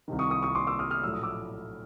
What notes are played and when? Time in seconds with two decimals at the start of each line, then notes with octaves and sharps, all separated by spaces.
0.08 C2 C3 D#3
0.19 C#6 D#6
0.31 C#6 D#6
0.43 C#6 D#6
0.55 C6 D6
0.67 D6 E6
0.79 D#6 F6
0.91 D#6 F6
1.02 A#1 A2 F#3 A3 E6
1.14 D#6
1.23 D6 E6